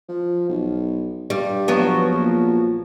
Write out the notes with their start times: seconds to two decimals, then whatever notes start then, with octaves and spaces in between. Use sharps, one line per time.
0.09 F3
0.49 B1
1.30 G2 G3
1.68 F3 F#3 B3
2.12 A#1